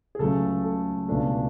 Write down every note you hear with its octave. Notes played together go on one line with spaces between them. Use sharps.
G#4
C#2 C#3 F#3 A3 A4
A4
C#2 B2 A3 D4